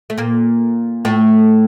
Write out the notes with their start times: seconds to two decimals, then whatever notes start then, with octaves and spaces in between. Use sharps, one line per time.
0.10 A3
0.18 A#2 A#3
1.05 A2 A3